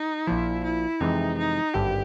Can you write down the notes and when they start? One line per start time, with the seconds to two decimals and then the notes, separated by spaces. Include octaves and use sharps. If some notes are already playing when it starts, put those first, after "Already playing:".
Already playing: D#4
0.27 A#1 A#2 F3 E4
0.64 E4
1.00 F2 C3 E3 G#3 D#4
1.38 D#4
1.74 G#1 G2 D3 G4